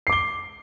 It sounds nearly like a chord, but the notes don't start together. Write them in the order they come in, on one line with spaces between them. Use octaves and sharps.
C7 D6 G7